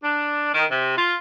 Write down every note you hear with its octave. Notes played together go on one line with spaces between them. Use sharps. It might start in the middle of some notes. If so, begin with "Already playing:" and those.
D4
D#3
C3
F4